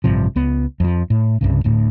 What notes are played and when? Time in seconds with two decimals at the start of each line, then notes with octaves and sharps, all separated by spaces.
0.04 A1 G2 C3 F3
0.36 C#2 B3
0.80 F2 F3
1.10 A2
1.41 C2 G2 C#3
1.64 D1 D2 A2